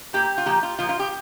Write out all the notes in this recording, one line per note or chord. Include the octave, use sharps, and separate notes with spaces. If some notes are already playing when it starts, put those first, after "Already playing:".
A#2 A#3 G4
F4
A#2 F3 A#3 G4
F4
A#2 F3 A#3 F4
F4
G4